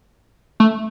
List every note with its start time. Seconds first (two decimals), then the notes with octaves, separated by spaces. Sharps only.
0.60 A3